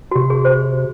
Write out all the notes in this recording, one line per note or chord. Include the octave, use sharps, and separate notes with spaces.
F#4
C3 G4
G#4
C5